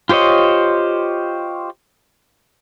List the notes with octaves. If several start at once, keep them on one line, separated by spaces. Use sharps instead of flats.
F4 G4 C5 C#5 D#5